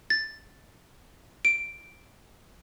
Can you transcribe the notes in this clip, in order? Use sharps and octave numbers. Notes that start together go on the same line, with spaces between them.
A6
D7